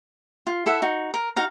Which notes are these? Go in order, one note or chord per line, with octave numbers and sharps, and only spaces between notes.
F4
E4 A4 E5 F#5
D#4 F#4
A#4
D#4 F#4 F5 A#5